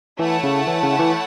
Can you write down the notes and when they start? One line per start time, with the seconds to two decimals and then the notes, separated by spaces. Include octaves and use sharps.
0.19 E3 A3 E4 C#5 F#5 A5
0.43 C#3
0.67 E3
0.83 C#3
0.99 E3